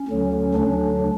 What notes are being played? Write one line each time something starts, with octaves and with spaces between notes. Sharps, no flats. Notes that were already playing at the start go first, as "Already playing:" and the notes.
Already playing: C#4
D2 D3 F#3
D2 D3 F#3 D4